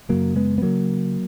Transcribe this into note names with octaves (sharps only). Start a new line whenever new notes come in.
F#2 C#3 F#3 A#3
G#3 B3
B3
C#3 F#3 A#3